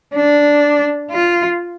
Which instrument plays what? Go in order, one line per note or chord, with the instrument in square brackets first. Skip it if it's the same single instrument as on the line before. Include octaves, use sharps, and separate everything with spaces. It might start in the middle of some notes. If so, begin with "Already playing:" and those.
[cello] D4
F4